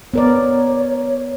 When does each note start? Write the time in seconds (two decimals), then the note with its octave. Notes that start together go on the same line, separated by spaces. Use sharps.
0.14 B3 A#4 C#5 D5